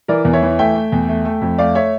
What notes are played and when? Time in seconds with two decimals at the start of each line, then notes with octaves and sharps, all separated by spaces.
0.08 E3 A#4 D5
0.25 E2
0.33 C#5 E5
0.43 E3
0.59 A3 E5 G5
0.76 A3
0.92 E2
1.09 A3
1.25 A3
1.42 F2
1.58 A3 D5 F5
1.75 C#5 E5